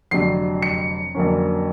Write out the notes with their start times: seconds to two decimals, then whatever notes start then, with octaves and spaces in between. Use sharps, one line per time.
0.11 F1 F2 D3 F#3 C7
0.62 C#7
1.15 F2 D3 F#3 A#3 C#4